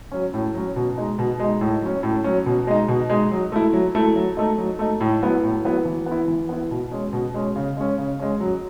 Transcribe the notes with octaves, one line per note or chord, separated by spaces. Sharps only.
F#3 C#4
A2
F#3 C#4
B2
G#3 D#4
B2
G#3 D#4
A2
F#3 C#4
A2
F#3 C#4
B2
G#3 D#4
B2
G#3 D#4
F#3
A3 E4
F#3
A3 E4
F#3
A3 D#4
F#3
A3 D#4
A2
F#3 B3 E4
A2
F#3 B3 E4
E3
B3
E4
E3
B3 E4
B2
G#3 C#4
B2
G#3 C#4
C#3
G#3 C#4
C#3
G#3 C#4
F#3